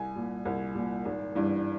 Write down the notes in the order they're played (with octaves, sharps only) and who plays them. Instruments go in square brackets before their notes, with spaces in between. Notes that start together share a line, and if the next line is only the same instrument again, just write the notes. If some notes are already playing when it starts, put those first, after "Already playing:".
Already playing: [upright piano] C2 G#5
A#2
C2
A#2
G#1
G2 E3